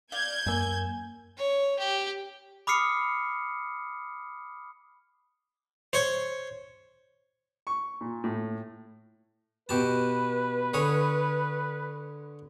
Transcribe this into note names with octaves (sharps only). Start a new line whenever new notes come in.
D5 F5 G6 G#6
F#2 A#3 G#5 E6
C#5
G4
B5 D6 D#6 F6 C7 C#7
C5 C#5
C#6
A#2
A2
B2 G4 B4 A5
D3 G#4 C#5